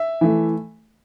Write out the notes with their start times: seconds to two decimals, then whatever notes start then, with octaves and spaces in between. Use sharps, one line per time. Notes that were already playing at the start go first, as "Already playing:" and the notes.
Already playing: E5
0.21 E3 A3